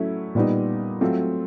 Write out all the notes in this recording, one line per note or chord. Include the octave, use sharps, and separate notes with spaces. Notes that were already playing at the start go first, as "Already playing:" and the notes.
Already playing: F#3 A3 C#4 E4
A#2 G3 B3 D#4
F#3 A3 C4 F4